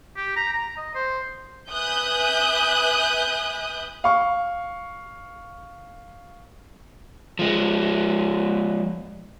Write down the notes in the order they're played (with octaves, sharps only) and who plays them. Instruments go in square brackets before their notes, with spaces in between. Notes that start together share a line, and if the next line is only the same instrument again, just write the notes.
[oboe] G4
A#5
A#5
D#5
C5
[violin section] B4 E5 G#5 D#6 F#6 G6
[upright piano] F5 C#6
[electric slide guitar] F3 G#3